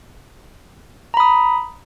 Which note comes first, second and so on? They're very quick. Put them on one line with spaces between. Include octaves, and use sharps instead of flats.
A#5 B5 D#6